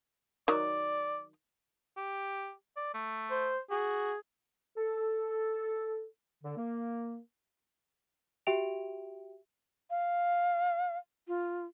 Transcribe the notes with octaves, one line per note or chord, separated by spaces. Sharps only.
D#3 F#3 D5
G4
D5
A3
C5
F#4 G#4
A4
D3
A#3
F#4 G4 E5 G5 D7 F7
F5
F4